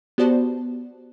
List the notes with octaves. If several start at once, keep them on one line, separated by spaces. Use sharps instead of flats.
B3 F#4 G4 C5 D5 A5